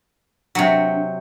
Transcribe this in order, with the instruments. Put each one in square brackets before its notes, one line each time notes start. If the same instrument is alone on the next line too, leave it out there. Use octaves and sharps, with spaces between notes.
[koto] C3 F#3 [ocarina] D4